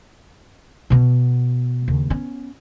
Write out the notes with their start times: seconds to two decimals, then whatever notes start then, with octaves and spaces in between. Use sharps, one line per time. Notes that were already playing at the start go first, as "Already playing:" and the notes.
0.90 B2 B3
1.88 D#2 C#3
2.10 B3 C#4